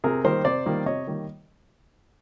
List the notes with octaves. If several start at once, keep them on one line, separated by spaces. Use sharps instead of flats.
C3 G#4 A#4
D#3 G3 A#3 A#4 C5
C3 C5 D5
D#3 G3 A#3
C3 C#5 D#5
D#3 G3 A#3